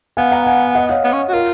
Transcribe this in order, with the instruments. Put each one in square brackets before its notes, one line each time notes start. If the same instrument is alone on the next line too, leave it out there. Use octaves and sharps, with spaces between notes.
[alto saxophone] B3 [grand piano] F5 G#5
[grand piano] F#5 A#5
F5 G#5
D#5 F#5
C#5 F5
[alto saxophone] B3
C#4
F#4
[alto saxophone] F4 [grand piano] A#4